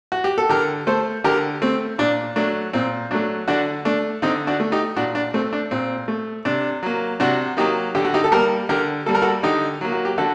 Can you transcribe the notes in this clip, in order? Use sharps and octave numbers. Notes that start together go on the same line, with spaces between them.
F#4
G4
A4
D3 G4 A#4
A3 A4 C5
D3 G4 A#4
A3 C4
A#2 D4
F#3 A3 D4
A#2 C4
F#3 A3 D4
D3 D4 F#4
A3 D4
D3 C4 D#4
D4 F#4
A3
D#4 G4
A#2 D4 F#4
D4
A3 C4
D4
A#2 C4
A3
C3 D4
F#3 A#3
C3 D4 F#4
F#3 A#3 D#4 G4
D3 G4
F#4
D#4 G4
A4
G3 A#3 G4 A#4
D3 G4 A#4
G3 A#3 A4
A#4
F#4 A4
D3 D#4 G4
F#3 A#3
F#4
G4
D3 F#4 A4